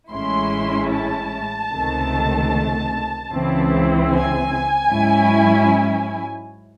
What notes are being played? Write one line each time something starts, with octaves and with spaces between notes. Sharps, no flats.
A1 A2 G#3 C#4 E4 C6
A5
C#2 C3 D#3 A3
C#2 C#3 E3 C4 E4
G#5
G#2 F#3 C#4 E4